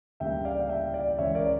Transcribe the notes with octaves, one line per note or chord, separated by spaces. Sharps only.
D2 C#3 G3 A#3 E5 G5
D5 F5
F5
E5 G5
D5 F5
C#2 C#3 E3 C#5 E5
A#4 D5